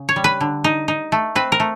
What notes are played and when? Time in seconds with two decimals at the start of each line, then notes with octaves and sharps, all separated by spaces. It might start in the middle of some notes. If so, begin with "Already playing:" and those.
Already playing: C#3
0.09 C#5
0.16 G3
0.24 B4
0.41 D3
0.64 D#4
0.88 D#4
1.12 A3
1.35 C4 B4
1.52 A#4
1.60 A3